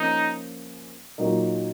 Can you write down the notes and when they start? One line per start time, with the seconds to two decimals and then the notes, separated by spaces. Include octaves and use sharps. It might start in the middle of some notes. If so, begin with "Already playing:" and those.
Already playing: F3 A#3 C#4 D#4
1.18 A#2 F#3 A#3 D#4